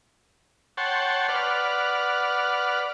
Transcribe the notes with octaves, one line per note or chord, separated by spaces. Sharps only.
C#5 F#5 G5 A5 C6
B4 D5 F#5 F6